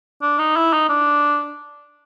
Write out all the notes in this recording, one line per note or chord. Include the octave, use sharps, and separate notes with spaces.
D4
D#4
E4
D#4
D4